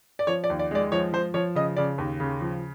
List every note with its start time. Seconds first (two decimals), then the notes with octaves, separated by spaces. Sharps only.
0.19 D5
0.27 F3 C#5
0.44 D5
0.50 D#2
0.59 D5
0.71 G#3 D5
0.92 F3 C#5
1.13 F3 C5
1.34 F3 C#5
1.55 C#3 D#5
1.77 C#3 D5
1.98 D#2
2.20 C#3
2.41 F3